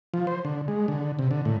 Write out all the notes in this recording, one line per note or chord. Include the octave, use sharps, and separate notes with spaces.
F3
C5
D3
G#3
D3
C3
D3
A2